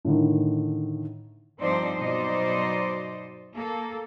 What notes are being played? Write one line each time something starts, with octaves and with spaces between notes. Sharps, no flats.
A2 D3 D#3
G2 F3 C4 D#4 C5 D5
B2 F#3 D#4 C5 D5 D#5
A#3 A4